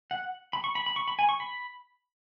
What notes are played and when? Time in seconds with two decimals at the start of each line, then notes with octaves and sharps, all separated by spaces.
0.11 F#5
0.53 B5
0.64 C#6
0.75 B5
0.86 B5
0.96 C#6
1.08 B5
1.19 G#5
1.29 C#6
1.40 B5